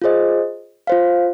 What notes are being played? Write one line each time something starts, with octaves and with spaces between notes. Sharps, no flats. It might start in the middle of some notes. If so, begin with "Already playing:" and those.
F4 G#4 C5 D#5
F4 C5 F5